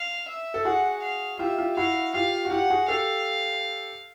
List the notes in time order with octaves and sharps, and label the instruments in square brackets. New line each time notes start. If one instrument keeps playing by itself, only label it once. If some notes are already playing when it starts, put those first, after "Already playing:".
Already playing: [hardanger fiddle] F5
E5
[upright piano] A4
[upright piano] F#4 G#4 [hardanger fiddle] F#5
[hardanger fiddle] F5
[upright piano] F4 G4 [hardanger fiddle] E5
[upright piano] F4 G4
[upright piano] E4 F#4 [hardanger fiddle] F5
[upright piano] F4 G4 [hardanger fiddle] F5
[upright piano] F#4
[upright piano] F4 G4 [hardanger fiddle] F#5
[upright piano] F#4 G#4
[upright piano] G4 A4 [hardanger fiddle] F5